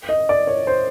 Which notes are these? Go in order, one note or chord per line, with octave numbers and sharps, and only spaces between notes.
D#5
D5
C#5
C5